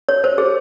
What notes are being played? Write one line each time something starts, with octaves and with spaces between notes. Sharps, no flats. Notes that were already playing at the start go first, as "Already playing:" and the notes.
C#5
C5
G#4